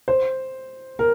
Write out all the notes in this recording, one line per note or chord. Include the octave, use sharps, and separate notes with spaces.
C5
A#4